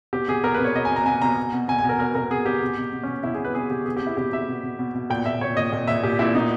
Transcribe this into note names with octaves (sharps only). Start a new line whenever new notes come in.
B2 G4
B2 G#4
B2 A#4
B4
B2 C#5
B2 D#5
G#5
B2
A#5
B2 G#5
B2 A#5
B2
B2
B2 G#5
G#5
B2
A#4
B2 A#4
B2 A#4
B2 G#4
B2 G4
B2
B2
B2
C#4
B2
B2 E4
G#4
B2
B4
B2 G#4
B2 G4
B2 G#4
G4
B2
E4
B2 G4
B2 E5
B2
B2
B2
B2
A#2 G5
A#2 E5
A#2 C#5
A#2 D#5
A#2
A#2 E5
A#2 G4
A#2 E4
B2 D#4